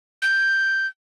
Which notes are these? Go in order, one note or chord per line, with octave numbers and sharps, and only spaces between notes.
G6